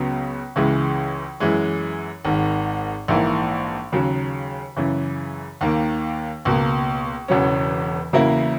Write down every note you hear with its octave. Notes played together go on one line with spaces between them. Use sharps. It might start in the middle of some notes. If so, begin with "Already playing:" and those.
Already playing: C#2 C#3 F#3 B3
C#2 C#3 E3 G#3
F#2 E3 G#3
G#1 G#2 D#3
A#1 G#2 E3 A#3
D#2 C#3 F#3
F#2 C#3 E3
D#2 D#3 A#3
C#2 B2 A#3
E1 E2 C#3 F#3 C#4
E2 C#3 F#3 A#3 E4